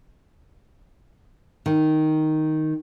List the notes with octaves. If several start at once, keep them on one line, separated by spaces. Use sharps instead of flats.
D#3